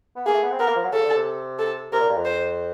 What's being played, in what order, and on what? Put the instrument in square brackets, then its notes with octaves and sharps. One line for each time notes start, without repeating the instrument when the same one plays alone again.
[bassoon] B3
[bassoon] A#3 [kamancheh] G#4
[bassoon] A3
B3
C4
[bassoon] B3 [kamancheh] A#4
[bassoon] A#3
F3
F#3
[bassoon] C#3 [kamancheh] A4
[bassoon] D3
C3
[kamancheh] A4
[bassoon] C3 [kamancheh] A#4
[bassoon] A#2
G2
F2
[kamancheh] C5